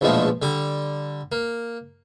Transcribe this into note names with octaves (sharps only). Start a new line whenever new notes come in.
A#1 E2 B2 F3 G#3 A3
D3 G3 D6
A#3